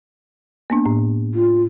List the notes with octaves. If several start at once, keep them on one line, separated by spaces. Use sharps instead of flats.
A#3 B3 D4
A2
F4